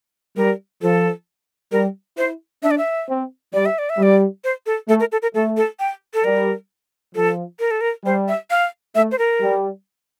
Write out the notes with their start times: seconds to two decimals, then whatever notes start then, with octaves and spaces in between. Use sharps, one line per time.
0.37 G3 A#4
0.82 F3 A4
1.72 G3 A#4
2.17 E4 C5
2.63 D4 E5
2.71 D5
2.78 E5
3.09 C4
3.53 G3 D5
3.66 E5
3.79 D5
3.90 E5
3.98 G3 D5
4.44 C5
4.66 A4
4.88 A3 A4
5.00 A#4
5.12 A4
5.22 A#4
5.34 A3 A4
5.57 A4
5.80 G5
6.14 A4
6.24 G3 A#4
7.15 F3 A4
7.60 A#4
7.71 A4
7.81 A#4
8.05 G3 C5
8.28 E5
8.50 F5
8.95 A3 E5
9.12 C5
9.19 A#4
9.41 G3